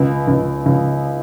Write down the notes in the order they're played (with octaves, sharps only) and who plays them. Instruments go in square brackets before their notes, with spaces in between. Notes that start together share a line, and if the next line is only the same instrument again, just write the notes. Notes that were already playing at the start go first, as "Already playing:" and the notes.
Already playing: [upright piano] C#2
C#2
C#2